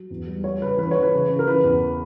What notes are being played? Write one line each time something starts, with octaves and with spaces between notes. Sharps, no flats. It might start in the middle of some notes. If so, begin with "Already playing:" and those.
Already playing: F#3
E2
G3
G3 C#5
C#3 B4
E3 B4
C#5
E3
B4
C#3
C#3
A#4
E3 B4
E2